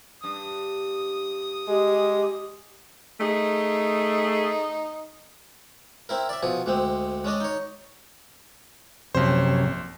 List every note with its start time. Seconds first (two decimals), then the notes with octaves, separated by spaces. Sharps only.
0.24 G2 D#6
1.68 G#3 G4
3.21 A3 D#4 G#4
6.09 C4 E4 A#4
6.29 D5 E5
6.43 B2 F3 G#4
6.66 D2 G#3 C4
7.24 G#3 C#4 D4 D#5
7.40 D#4 C#5
9.15 A#1 F#2 C3 C5 C#5